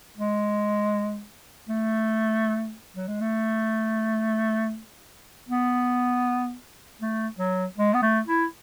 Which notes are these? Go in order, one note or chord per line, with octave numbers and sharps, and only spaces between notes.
G#3
A3
F#3
G#3
A3
B3
A3
F#3
G#3
B3
A3
E4